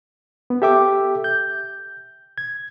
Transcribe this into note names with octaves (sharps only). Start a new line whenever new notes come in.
B3
G4 A4 E5 G5 D6
G6
G#6